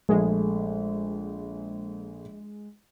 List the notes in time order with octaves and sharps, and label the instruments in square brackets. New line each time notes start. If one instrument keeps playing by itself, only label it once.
[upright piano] A#1 A3 [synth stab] G#3